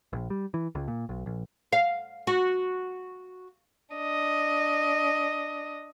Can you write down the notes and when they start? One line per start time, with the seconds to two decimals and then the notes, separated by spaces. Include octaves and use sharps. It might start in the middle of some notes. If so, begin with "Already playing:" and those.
0.13 A#1
0.30 G3
0.54 E3
0.75 C#2
0.88 A#2
1.09 B1
1.26 A#1
1.73 F5
2.27 F#4
3.94 D4 D#5